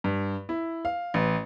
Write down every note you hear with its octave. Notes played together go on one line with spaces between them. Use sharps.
G2
E4
F5
A1